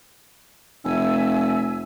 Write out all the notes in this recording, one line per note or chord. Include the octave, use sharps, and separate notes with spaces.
F1 E5 G#5 E6